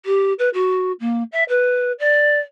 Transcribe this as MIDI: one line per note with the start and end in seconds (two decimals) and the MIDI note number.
0.06 0.33 67
0.39 0.49 71
0.54 0.92 66
1.00 1.23 58
1.32 1.43 76
1.49 1.92 71
1.99 2.40 74